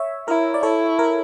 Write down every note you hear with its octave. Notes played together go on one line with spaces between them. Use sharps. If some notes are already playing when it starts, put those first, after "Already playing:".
Already playing: C#5 E5
E4 A#4
D5
E4 A4 C#5
A#4